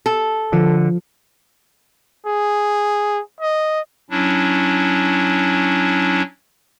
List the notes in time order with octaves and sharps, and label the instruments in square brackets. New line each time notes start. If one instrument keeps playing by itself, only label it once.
[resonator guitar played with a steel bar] A4
[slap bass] D3 [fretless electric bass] F3
[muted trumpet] G#4
D#5
[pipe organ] F#3 C#4 D4 E4